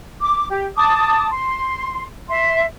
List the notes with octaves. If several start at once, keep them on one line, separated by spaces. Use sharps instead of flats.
D6
G4
A5 D6 D#6
C6
E5 C6